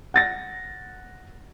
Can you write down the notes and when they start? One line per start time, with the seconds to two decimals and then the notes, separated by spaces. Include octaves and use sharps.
0.14 F#5 A6 A#6